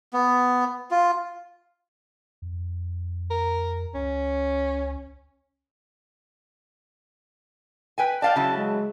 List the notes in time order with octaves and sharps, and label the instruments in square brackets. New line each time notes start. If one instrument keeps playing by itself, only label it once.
[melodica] B3
F4
[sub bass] F2
[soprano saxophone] A#4
[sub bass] C#2 [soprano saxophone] C#4
[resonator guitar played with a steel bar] B4 G5 G#5
[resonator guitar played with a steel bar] D5 F5 G5 [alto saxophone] A5
[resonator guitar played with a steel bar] C#3 F#3 E4
[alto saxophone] G#3